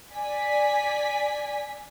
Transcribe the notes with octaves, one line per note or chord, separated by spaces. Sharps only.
D5 G#5 B6